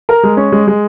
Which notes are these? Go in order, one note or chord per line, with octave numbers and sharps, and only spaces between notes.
A#4
G#3
C#4
G#3
G#3